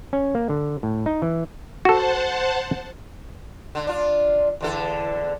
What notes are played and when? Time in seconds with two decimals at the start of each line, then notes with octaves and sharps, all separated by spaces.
0.13 C#4
0.35 A#3
0.49 D3
0.83 A2
1.06 D#4
1.22 E3
1.85 F#4 A4 C5 F#5 A5
3.75 D3
3.87 D4 F4
4.61 E2 D3 A4